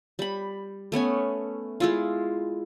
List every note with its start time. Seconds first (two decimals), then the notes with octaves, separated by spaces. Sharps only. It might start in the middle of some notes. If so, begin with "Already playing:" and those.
0.19 G3 B5
0.92 A3 B3 C#4 G#5
1.80 G#3 E4 F4